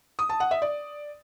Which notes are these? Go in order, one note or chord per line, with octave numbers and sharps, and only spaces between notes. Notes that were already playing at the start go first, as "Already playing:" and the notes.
D#6
A5
F#5
E5
D5